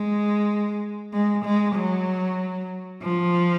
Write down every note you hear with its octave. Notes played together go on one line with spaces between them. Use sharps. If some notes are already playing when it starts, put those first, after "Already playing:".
Already playing: G#3
G#3
G#3
F#3
F3